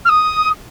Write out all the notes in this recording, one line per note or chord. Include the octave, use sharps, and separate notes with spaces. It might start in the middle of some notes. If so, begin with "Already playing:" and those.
F6
D#6